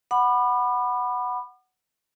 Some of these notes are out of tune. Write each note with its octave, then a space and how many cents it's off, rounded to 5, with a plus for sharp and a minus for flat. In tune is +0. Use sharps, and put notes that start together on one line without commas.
F#5 +0 B5 +0 D6 +45